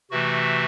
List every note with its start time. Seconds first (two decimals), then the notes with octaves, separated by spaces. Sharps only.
0.11 C3 E3 A3 F#4